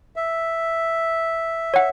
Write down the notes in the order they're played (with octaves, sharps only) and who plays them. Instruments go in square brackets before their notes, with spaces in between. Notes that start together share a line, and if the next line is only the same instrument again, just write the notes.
[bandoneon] E5
[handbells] C#5 F#5